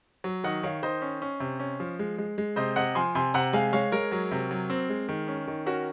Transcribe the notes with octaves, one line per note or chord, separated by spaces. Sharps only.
F#3
D#3 D#5 F#5
D#3 C#5 F5
D#3 C5 D#5
C#4
C#4
C3
C#4
F3
G#3
G#3
G#3
C3 C5 D#5
C3 D#5 F#5
F3 G#5 C6
C3 G#5 C6
C3 F#5 A#5
G#3 F5 G#5
G#3 C#5 F5
G#3 A#4 C#5
F#3
C3
F#3
C4
G#3
D#3
C#4
D#3
C#4 F#4 A#4